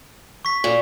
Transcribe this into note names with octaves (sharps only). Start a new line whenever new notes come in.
C#6 B6
A#2